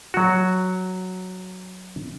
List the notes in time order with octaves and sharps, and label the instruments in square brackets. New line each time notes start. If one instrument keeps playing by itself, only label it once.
[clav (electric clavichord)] F#3 F#4